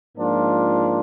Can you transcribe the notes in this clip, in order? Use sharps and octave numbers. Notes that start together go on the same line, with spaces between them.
G#2 F3 A#3 D4 F4